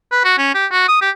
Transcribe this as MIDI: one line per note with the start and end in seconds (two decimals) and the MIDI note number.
0.12 0.20 71
0.25 0.34 66
0.38 0.53 61
0.55 0.66 67
0.72 0.84 66
0.89 0.99 87
1.02 1.10 67